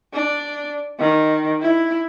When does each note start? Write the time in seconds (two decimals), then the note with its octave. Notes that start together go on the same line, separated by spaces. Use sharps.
0.13 D4
0.99 D#3
1.61 E4